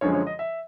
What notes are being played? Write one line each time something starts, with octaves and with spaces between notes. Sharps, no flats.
F#2 D3 F3 G#3 C#5
C#5
D#5
E5